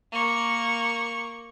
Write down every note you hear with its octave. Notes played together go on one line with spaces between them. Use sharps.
A#3 C#6